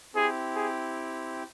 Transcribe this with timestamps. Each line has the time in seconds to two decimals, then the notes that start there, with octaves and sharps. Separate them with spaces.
0.14 C4 E4 G4 G#4
0.55 G#4